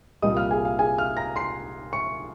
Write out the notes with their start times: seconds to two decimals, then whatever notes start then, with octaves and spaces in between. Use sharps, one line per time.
0.22 C2 A#2 G3 D#5 D#6
0.37 F5 F6
0.50 G#4 G#5
0.65 F5
0.79 G#4 G#5
0.98 F5 F6
1.17 A#5 A#6
1.36 C6 C7
1.93 C#6 C#7